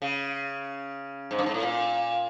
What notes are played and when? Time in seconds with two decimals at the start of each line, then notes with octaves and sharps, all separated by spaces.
0.02 C#3
1.31 G#2
1.39 G2
1.46 G#2
1.54 A2
1.63 A#2